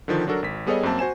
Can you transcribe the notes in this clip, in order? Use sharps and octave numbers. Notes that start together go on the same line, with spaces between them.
D3 D#3 F3
F#3 D4 F#4 A4 A#4
G#1 B6
G3 B3 G#4 A4 C#5 D#5
F#2 A#3 C4 A5
F#4 C5 G#5 E7